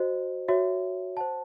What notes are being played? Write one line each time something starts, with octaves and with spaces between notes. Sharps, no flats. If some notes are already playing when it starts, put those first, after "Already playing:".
Already playing: F#4 C5 D#5
F#4 C#5 E5
C5 F#5 A5